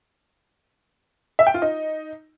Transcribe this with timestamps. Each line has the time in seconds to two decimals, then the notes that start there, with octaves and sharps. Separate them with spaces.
1.39 E5
1.47 G5
1.54 F4
1.62 D#4